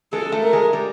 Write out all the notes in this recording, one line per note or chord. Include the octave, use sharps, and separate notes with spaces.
G#3 A4
A3
A#4
G#3
G3